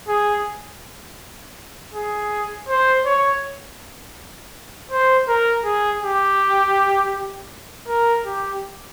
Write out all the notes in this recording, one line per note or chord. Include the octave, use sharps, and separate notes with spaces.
G#4
G#4
C5
C#5
C5
A#4
G#4
G4
A#4
G4